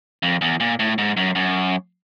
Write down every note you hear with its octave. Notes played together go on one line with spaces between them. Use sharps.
F2
E2
A#2
A2
G#2
F#2
F#2